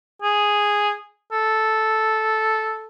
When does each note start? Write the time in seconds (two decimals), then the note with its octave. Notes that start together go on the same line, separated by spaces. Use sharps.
0.22 G#4
1.32 A4